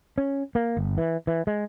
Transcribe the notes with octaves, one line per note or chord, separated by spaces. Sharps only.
C#4
A#3
G1
E3
E3
G#3